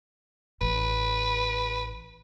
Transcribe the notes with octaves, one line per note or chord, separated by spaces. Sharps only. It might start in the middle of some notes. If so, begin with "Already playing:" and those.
A1 B4